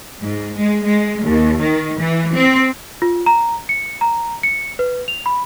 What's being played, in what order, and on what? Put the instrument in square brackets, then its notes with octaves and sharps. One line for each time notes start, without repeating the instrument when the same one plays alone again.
[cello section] G#2
G#3
G#3
D#2
D#3
E3
C4
[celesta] F4
A#5
C#7
A#5
C#7
B4
F7
B5